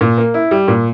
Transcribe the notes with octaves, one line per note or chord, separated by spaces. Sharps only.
A#2
A#3
E4
G3
A#2